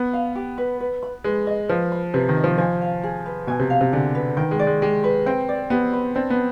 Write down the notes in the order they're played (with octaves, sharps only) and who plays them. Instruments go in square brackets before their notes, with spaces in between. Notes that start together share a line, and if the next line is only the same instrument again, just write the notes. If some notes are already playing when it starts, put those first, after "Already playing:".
Already playing: [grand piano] B3
[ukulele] F5
G4
B4
B4
B5
[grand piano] G#3 [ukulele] B4
[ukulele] D#5
[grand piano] F3 [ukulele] B4
[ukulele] B5
[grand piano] C3 [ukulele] B4
[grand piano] D#3
[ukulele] D#5
[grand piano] F3
[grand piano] F3 [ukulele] G#5
[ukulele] F5
G#4
B4
[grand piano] B2 [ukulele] G#5
[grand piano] C3
[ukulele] F5
[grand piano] C3
[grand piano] D3 [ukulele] G#4
[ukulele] B4
[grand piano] D#3 [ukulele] G5
[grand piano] G#3
[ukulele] D5
[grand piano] G#3
[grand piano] G#3 [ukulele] G4
[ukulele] B4
[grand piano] C4 [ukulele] G5
[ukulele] D5
[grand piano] B3 [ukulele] G4
[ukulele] B4
[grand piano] C4 [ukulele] D4
[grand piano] B3